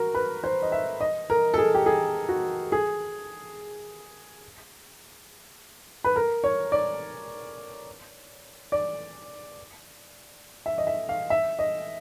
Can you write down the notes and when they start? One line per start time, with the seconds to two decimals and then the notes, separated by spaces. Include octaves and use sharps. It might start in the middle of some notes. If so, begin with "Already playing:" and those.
Already playing: F#4 A#4
0.14 B4
0.44 C5
0.62 D#5
0.72 E5
1.01 D#5
1.30 A#4
1.54 A4
1.58 G#4
1.75 G4
1.86 G#4
2.29 F#4
2.72 G#4
6.04 B4
6.16 A#4
6.44 C#5
6.72 D5
8.72 D5
10.66 E5
10.78 D#5
10.87 E5
11.09 F5
11.30 E5
11.59 D#5